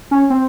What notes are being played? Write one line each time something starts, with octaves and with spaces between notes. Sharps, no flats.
C#4
C4